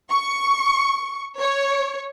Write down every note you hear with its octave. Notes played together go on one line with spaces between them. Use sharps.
C#6
C#5